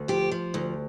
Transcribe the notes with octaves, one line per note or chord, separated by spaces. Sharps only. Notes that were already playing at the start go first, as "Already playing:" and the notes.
Already playing: D2
F3 G4
F3
D2